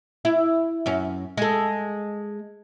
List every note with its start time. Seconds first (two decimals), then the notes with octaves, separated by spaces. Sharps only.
0.25 E4
0.86 F#2 C#4
1.37 G#3 A4